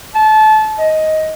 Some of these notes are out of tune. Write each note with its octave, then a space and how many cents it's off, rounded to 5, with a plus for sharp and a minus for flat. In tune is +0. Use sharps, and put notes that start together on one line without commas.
A5 -25
D#5 +10